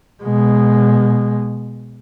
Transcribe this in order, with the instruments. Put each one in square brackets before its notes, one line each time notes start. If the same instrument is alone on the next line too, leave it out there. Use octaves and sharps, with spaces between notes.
[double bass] B2 G#3